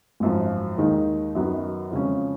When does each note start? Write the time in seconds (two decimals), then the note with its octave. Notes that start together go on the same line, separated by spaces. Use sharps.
0.20 G#1 F#2 F3
0.78 D#2 D#3 G#3 D#4
1.35 F#2 D#3 F#3 B3 D#4
1.91 F2 C#3 G#3 C#4